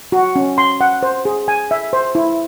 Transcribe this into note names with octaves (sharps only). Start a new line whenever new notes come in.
F#4
C#4
C6
F#5
C5
G#4
G#5
E5
C5
E4